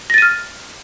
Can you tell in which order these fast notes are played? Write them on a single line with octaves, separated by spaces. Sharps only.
A#6 A6 D#7 F6